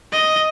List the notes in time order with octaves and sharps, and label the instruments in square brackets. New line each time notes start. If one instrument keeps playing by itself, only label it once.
[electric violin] D#5